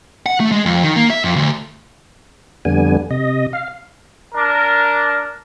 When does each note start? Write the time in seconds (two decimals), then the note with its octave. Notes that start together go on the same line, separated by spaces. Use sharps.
0.26 F#5
0.40 A3
0.52 G#3
0.66 F2
0.83 D#3
0.96 A#3
1.10 E5
1.24 F2
1.36 D2
2.65 F2 D3 G3 B3 G#5
3.11 C3 D#5
3.53 F5
4.34 D4 A#4